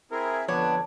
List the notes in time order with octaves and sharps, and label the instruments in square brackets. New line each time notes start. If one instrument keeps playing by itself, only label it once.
[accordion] C4 E4 G#4 [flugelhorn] A#4
[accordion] F2 D3 [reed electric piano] F3 C#5 G#6 [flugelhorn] B3 [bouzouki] D4